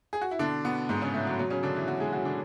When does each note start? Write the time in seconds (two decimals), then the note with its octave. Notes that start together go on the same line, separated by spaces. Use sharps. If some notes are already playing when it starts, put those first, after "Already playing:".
0.13 G#4
0.21 F#4
0.31 E4
0.39 B2 D3 D4
0.64 B2 B3
0.89 G#2 B2 G#3
1.01 C#3 C#4
1.13 A2 A3
1.27 F#3
1.39 B2 F#3
1.50 C#3 C#4
1.63 D3 D4
1.76 E3 E4
1.88 B2 F#3 F#4
2.00 G#3 G#4
2.12 F#3 F#4
2.25 D3 D4